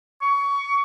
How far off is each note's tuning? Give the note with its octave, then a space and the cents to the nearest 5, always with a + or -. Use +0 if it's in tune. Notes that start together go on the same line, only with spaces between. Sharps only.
C#6 +20